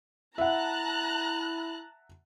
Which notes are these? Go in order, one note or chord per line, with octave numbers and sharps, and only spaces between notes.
E4 E5 F#5 A5 A#5 F#6